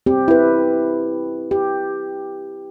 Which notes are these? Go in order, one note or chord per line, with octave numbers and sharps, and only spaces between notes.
C4 G4
E4 B4
G4